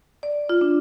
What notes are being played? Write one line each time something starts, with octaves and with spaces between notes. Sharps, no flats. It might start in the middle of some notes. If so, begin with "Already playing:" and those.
D5
F4
D4